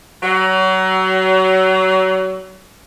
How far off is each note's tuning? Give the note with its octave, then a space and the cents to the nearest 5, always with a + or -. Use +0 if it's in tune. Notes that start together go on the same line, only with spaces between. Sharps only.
F#3 +30